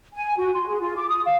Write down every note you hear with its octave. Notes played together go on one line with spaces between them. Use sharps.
G#5
F#4
C6
G#4
F4
D6
D#6
F5